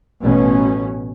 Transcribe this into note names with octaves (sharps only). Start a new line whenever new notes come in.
A1 B2 C#4